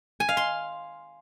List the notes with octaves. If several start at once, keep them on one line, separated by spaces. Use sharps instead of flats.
G#5
F5
C6